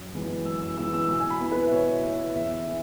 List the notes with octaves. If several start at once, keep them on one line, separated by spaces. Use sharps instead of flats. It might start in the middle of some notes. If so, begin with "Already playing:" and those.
Already playing: F#2
E3 G#3 B3 E4
F#2 E6
E6
E3 G#3 B3 E4 E6
E6
B2 E6
G#5
B5
B3 E4
B4
E5
B2 C#5
B3 E4
E2 E5
E3